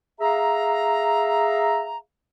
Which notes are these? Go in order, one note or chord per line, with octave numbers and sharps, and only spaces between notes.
G#4 E5 F5 A#5